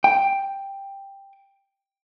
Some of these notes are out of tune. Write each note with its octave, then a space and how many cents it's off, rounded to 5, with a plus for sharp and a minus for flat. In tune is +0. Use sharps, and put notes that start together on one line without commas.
G5 +5